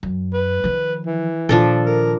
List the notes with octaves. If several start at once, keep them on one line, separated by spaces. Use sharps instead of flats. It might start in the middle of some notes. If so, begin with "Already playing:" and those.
F#2
B4
D#3 F3
E3
A#2 D#3 F3 D4 A4
A#4